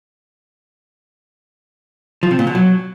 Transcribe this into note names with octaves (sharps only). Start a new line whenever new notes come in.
F3
C3
A#2
B2
F#3